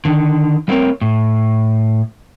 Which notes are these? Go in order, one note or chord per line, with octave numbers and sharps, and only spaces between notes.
D3 D#3
G3 A3 A#3 C4 A#4 C#5
A2